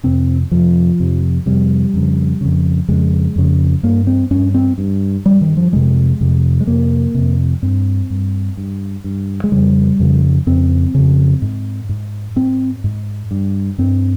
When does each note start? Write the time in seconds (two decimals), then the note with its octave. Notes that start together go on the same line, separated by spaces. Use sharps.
0.04 F2 C3 C4
0.51 F2 C3 F3
0.99 F2 C3
1.46 F2 C3 G3
1.94 F2 C#3
2.41 F2 C#3
2.88 F2 C#3 G#3
3.36 F2 C#3
3.83 G2 A#3
4.07 C4
4.31 G2 C#4
4.54 C4
4.78 G2
5.26 G2 G3
5.41 D#3
5.57 F3
5.73 F2 C3 G#3
6.21 F2 C3
6.61 G#3
6.67 F2 C3 A#3
7.15 F2 C3
7.62 G2 C4
8.10 G2
8.57 G2
9.04 G2
9.44 G#3
9.52 F2 C#3 G3
9.99 F2 C#3
10.46 F2 C#3 C4
10.94 F2 C#3
11.42 G#2
11.89 G#2
12.36 G#2 C4
12.84 G#2
13.31 G2
13.78 G2 C4